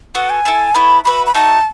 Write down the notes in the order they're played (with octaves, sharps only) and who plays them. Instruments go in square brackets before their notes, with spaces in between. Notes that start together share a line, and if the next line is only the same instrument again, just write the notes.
[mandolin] B3 F#4 A4 [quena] F#5
[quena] G#5
[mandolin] E4 A4 E5 A5
[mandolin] B3 E4 A4 C#5 [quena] B5
[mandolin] F#4 B4 E5 [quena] B5
[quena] B5
[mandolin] A3 D#4 F#4 [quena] A5